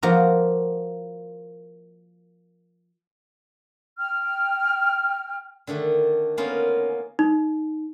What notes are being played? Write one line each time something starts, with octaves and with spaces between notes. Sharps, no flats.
F3 A#3 F#4 A#4
G5 F6
D3 D#3 A3 D4
A#3 B3 C#4 D#4 F4
D#4